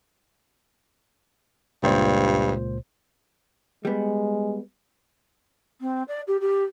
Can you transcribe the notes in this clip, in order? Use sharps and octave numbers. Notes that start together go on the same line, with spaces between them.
C#2 G2 A#2 C5
G3 G#3 B3
C4
D5
G4
G4